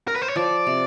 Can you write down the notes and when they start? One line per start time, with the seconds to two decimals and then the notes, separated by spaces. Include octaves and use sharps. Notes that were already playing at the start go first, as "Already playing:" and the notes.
0.08 A#4
0.14 B4
0.22 C5
0.28 C#5
0.36 F3 D5
0.67 C3